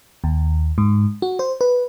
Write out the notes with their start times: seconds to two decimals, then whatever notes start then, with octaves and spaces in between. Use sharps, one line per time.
0.24 D#2
0.78 G#2
1.22 F#4
1.39 C5
1.61 B4